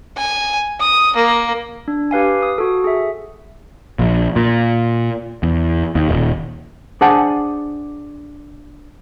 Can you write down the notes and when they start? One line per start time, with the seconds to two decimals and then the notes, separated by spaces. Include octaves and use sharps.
0.17 G#5
0.80 D#6
1.16 A#3
1.88 D4
2.11 G4 B4 F5 G#5
2.42 D#6
2.58 F#4 A4
2.84 G#4 E5
3.99 A#1
4.36 A#2
5.43 E2
5.95 D#2
6.09 D#1
7.01 D4 G#4 C5 F#5 G#5 A5